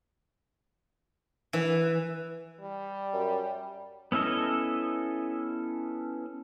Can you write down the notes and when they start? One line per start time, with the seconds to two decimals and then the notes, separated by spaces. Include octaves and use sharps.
1.53 E3
2.61 G3
3.13 F#2
4.12 B3 C#4 E4 A4 D#5